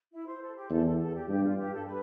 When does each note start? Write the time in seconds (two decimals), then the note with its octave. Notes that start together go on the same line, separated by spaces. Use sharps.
0.12 E4
0.27 C5
0.42 A4
0.56 G4
0.70 E2 A4
0.85 A4
0.99 A4
1.14 G4
1.29 G2 G4
1.44 F4
1.58 G4
1.73 A4
1.86 B4